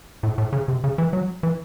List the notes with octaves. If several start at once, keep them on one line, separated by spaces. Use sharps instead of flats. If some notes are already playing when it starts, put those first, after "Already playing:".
A2
A2
C#3
C3
C#3
E3
F#3
E3